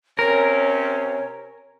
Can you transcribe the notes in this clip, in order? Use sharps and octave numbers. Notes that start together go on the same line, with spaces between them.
C3 C#4 A#4 C#5